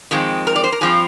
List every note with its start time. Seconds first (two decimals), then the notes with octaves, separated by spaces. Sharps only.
0.11 F2 D#3 G#3 C4
0.47 A#4
0.56 D5
0.64 C5
0.72 A#4
0.81 G2 F3 C4 G#4